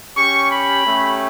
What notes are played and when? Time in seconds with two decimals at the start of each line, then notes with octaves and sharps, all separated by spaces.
0.16 C#4 G4 C#6
0.50 B5
0.85 A3 C#4 G4